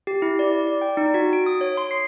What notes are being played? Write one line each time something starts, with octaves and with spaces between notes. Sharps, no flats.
G4
E4
D5
D5
G5
D#4
F#4
D7
D#6
C#5
C6
C7